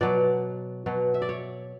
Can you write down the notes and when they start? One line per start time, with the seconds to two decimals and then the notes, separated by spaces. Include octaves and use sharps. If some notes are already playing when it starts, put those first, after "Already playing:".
0.01 B2 F#3 D5
0.86 B2 F#3
1.14 E5
1.22 D5
1.29 C#5